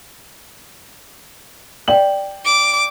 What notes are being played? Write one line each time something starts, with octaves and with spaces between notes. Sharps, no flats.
D5 G5 F#7
D6